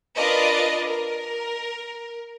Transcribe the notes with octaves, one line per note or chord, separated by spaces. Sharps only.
D4 F4 A#4 B4 D5 D#5
A#4